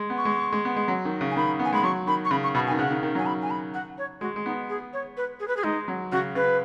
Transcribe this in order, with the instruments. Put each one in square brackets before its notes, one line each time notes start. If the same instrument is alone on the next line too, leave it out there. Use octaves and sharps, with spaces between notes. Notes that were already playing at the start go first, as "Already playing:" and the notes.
Already playing: [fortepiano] G#3
B3
[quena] C#6
[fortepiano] G#3
G#3
B3
G#3
F#3
D#3
C#3
[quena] G#5
[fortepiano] D#3 [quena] B5
[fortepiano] B3
[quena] G#5
[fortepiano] G#3 [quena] B5
[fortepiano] F#3 [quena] C#6
[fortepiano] D#3 [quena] B5
[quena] C#6
[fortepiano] C#3 [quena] B5
[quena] C#6
[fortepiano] B2 [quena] B5
[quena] G#5
[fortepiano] D#3
[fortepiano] C#3 [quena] F#5
[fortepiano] D#3
D#3
[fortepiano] F#3 [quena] G#5
[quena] B5
G#5
B5
F#5
C#5
[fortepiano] G#3 [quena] F#4
[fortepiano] G#3
[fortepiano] B3 [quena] D#4
[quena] G#4
C#5
B4
G#4
B4
G#4
[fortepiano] G#3 [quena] D#4
[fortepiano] F#3
[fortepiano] C#3 [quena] F#4
[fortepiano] C#3 [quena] B4